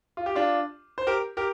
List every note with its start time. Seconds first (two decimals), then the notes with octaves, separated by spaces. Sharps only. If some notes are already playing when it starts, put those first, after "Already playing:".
0.17 F4
0.26 G4
0.35 D4 F4
0.98 C5
1.07 G4 A#4
1.37 G4 A#4